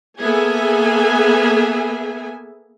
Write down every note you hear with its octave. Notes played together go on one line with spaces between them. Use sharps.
A#3 B3 G#4 A4 E5 G#5